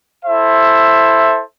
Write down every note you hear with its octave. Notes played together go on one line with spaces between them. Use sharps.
E4 A4 C5 E5